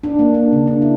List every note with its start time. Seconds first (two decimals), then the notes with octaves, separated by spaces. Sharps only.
0.03 D4
0.19 A#3
0.34 D4
0.52 C#3
0.67 D4
0.82 E4